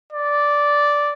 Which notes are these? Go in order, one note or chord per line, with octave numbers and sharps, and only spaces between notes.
D5